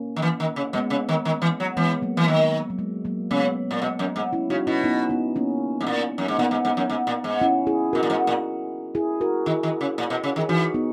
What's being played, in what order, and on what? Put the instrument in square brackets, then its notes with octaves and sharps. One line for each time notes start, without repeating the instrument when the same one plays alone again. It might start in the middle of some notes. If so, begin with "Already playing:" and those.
Already playing: [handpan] A#3 C#4
[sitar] D#3
E3
D#3
C#3
[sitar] B2 [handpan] G#3 B3
[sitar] C#3
D#3
D#3
E3
F#3
[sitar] E3 [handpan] G#3 B3
[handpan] F#3 A#3
[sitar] E3
D#3
[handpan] F#3
G#3
F#3 A#3
[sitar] C#3 [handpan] G#3 B3
[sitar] A#2
B2
F#2
G#2
[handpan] C#4 E4
[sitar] C#3 [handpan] D#4 F#4
[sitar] B2 [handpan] C#4 E4
[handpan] B3 D#4
B3 D#4
A#3 C#4
[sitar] G#2
A#2
F#2
G#2
[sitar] A#2 [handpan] B3 D#4
[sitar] G#2
G#2
F#2
G#2
A#2
G#2
[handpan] C#4 E4
E4 G#4
[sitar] B2 [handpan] F#4 A#4
[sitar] A#2
G#2
A#2
[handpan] E4 G#4
F#4 A#4
[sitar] D#3 [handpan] E4 G#4
[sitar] D#3
C#3
A#2
B2
C#3
[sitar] D#3 [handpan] G#4
[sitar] E3 [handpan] D#4 F#4
[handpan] B3 D#4